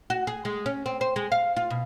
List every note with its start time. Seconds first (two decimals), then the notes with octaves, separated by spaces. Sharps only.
0.10 F#4
0.27 G#4
0.45 G#3
0.66 C#4
0.86 C4
1.01 C5
1.16 G#3
1.32 F5
1.57 F4
1.70 B2